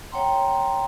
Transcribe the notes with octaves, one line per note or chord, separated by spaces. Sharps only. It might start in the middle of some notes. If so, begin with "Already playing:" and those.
C#5 F#5 G5 A#5 C6